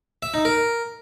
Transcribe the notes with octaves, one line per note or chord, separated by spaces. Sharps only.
E5
D#4
A#4